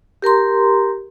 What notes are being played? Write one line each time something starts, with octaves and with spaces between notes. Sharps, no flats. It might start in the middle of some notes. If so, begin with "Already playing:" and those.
G4 A#4 A#5 C6